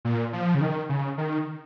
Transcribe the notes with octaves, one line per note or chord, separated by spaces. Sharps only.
A#2
F3
C#3
D#3
C#3
D#3